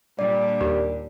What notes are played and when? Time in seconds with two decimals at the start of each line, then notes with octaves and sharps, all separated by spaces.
0.19 A#2 G3 D4 D5
0.61 D#2